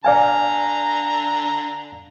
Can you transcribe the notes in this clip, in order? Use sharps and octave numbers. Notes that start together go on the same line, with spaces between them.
D3 D5 F5 G#5 A#5